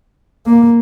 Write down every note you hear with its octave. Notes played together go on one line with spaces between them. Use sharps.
A#3